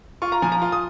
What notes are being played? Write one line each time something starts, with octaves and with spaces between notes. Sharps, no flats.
F4 C#6
A#5
F3 G#5
A#5
F4
D#6